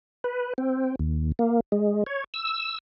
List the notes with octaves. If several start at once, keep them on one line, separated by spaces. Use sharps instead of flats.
B4
C4
D#2
A#3
G#3
C#5
E6